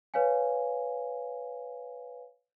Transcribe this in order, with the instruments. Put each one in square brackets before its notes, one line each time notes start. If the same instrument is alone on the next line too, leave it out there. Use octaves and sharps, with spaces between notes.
[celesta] B4 C#5 F5 G#5